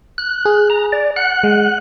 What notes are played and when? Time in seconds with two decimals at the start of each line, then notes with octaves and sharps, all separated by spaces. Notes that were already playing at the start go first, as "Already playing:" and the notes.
0.18 F#6
0.45 G#4
0.70 A#5
0.92 D5
1.16 F#5 F#6
1.44 G#3